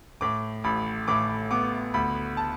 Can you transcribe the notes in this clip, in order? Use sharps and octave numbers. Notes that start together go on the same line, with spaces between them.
A2 D6
A1 B5
A2 D6
B3 D6
D2 B5
A5